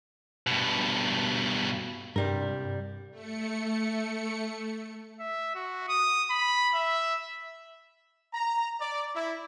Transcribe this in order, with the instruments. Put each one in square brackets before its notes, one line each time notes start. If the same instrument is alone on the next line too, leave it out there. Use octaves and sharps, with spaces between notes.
[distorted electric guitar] G2 B2
[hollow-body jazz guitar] C2 G3 A#4 [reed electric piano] G2
[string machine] A3 C#7
[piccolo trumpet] E5
F#4
D#6
B5
E5
[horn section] A#5
D5
E4